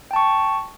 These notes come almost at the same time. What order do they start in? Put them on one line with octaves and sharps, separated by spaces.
G5 A5 C#6